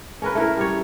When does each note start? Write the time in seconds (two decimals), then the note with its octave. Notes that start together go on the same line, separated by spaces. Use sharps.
0.22 C#4 A#4 B4
0.35 A3 E4 A#4
0.57 G3 C#5